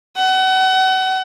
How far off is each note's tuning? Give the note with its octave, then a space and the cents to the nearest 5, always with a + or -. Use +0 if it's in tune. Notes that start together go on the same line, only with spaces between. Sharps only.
F#5 +35